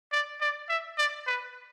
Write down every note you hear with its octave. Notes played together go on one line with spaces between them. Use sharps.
D5
D5
E5
D5
B4